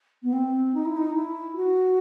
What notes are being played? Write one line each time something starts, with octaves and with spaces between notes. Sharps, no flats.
B3
C4
D#4
E4
D#4
E4
F#4